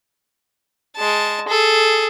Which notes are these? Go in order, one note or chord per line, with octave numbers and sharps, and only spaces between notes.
G#3 A5
G#4 A4